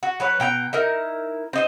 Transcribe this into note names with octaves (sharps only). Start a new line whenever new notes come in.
F#4
F#3 B4 C#5
B2 G5 A#5
D#4 E4 A#4
C4 D#4 C5